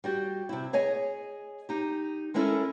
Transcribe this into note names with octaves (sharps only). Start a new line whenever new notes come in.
G3 F#4 G4
C3 E4
G#4 C#5 D#5 G#5
D#4 G4
G#3 B3 C#4 E4 A4 A#4